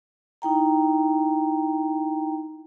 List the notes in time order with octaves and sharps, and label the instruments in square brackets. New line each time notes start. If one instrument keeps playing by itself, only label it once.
[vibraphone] D#4 E4 G5 A#5